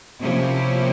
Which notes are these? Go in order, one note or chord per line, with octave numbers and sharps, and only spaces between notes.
C3 F3 A#3 C#4 E4 G4